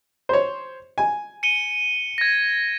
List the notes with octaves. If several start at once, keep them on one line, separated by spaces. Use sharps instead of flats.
C5 C#5
G#5
C#7 D#7 G7
G#6 A#6